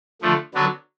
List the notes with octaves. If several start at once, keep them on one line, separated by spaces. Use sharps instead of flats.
D3 F3 A3
D3 F#3 B3 D4 F#4